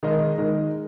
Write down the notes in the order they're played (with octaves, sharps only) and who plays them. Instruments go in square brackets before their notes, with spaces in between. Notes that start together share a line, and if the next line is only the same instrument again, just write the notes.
[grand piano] D#3 G#3 D#4 A#4 D#5
D#3 G#3 D#4 A#4 D#5